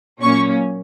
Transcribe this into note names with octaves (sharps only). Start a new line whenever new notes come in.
A#2 F#3 A#3 C#4 C#6